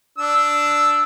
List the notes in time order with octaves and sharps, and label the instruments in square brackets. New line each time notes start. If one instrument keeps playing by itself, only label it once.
[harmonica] D4 E6